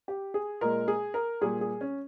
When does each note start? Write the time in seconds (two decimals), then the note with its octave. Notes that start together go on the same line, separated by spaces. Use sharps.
0.08 G4
0.34 G#4
0.61 A#2 G#3 A#4
0.88 G#4
1.14 A#4
1.41 A#2 G3 G#4
1.61 G#4
1.81 C#4